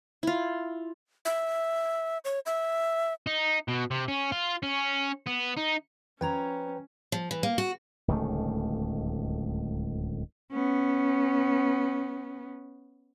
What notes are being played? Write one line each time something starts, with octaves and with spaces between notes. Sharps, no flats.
E4 F4
E5
C#5
E5
D#4
B2
C3
C#4
F4
C#4
B3
D#4
F3 C#4 B4 C#5 G5 A#5
F3
E3
A#3
F#4
D1 C#2 D#3 A3
B3 C#4